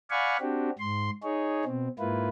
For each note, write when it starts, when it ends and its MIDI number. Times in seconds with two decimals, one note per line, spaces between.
0.11 0.37 74
0.11 0.37 77
0.11 0.37 78
0.11 0.37 80
0.11 0.37 83
0.11 0.37 85
0.40 0.70 60
0.40 0.70 62
0.40 0.70 66
0.40 0.70 67
0.79 1.10 44
0.79 1.10 84
1.23 1.64 63
1.23 1.64 68
1.23 1.64 73
1.65 1.88 47
1.65 1.88 60
1.99 2.29 44
1.99 2.29 58
1.99 2.29 64
1.99 2.29 65
1.99 2.29 71